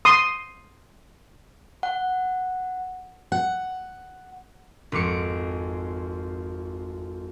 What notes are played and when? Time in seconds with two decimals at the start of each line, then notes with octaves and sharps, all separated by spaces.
0.05 C6 D#6
1.83 F#5
3.32 F#5
4.92 G#1 F2 D6 C#7